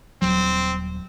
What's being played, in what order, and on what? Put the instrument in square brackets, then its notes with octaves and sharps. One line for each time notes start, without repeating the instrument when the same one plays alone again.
[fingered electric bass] D#1 F#3 [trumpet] C4